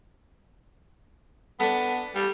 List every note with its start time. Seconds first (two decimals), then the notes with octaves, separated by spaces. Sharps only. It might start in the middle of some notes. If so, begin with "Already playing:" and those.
1.60 B3 D4 A4
2.15 G3